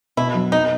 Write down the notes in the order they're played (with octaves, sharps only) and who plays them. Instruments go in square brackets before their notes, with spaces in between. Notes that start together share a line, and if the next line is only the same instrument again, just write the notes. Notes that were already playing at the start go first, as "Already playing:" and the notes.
[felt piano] B2 [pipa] E4
[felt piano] F#3
[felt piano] B3 [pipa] D#4